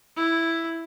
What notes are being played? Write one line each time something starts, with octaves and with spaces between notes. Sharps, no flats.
E4